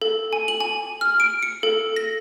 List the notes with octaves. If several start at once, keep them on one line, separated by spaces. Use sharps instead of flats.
A4
G#5
F#7
G#5
F6
D7
C#7
A4
A#6